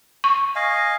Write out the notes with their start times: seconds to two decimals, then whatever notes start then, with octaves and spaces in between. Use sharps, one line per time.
0.24 C#6
0.56 D#5 F5 G#5